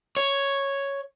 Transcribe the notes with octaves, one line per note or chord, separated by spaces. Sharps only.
C#5